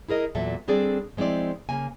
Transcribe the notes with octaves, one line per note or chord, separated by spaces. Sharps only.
E4 G#4 A#4 D#5
E2 A#2 F#3 A4 E5
G3 C4 D4 G#4 A4 D5
F3 G#3 C4 E4 D5
C#3 A#3 G#5